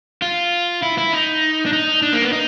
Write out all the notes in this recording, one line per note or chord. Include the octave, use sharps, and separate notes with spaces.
F4
E4
E4
D#4
D4
D#4
D4
A#3
B3
D#4